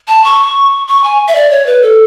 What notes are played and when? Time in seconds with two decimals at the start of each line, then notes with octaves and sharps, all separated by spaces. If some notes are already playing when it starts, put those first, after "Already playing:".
0.08 A5
0.25 C#6
0.87 C#6
1.04 G#5
1.28 E5
1.35 D5
1.51 C#5
1.66 B4
1.82 A4